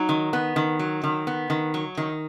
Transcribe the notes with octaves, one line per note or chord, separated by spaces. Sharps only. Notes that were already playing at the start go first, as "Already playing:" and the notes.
Already playing: F#3 D#4
D#3
B3
D#3
F#3
D#3
B3
D#3
F#3
D#3